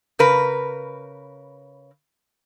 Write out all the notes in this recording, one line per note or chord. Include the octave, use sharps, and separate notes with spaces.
C#3 A#4 B4